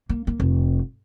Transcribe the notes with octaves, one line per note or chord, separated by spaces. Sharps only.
A#3
A#3
F1